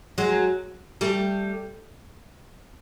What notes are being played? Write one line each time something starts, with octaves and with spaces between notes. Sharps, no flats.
F#3 G#3
G3 A3